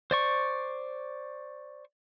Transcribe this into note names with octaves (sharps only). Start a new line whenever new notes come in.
C5 D5 C#6